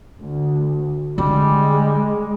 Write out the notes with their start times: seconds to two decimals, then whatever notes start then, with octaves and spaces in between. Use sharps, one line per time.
0.19 D2
1.18 D3 G3 G#3